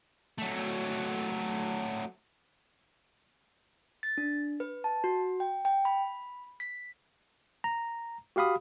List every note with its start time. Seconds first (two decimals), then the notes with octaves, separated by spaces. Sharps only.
0.38 F#3 A3
4.03 A6
4.18 D4
4.60 B4
4.84 A5
5.04 F#4
5.40 G5
5.65 G5
5.85 B5
6.60 B6
7.64 A#5
8.36 F#4 G4 F5 B5 D#6